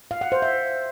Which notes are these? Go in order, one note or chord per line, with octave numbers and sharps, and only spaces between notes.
F5
F#5
C5
E5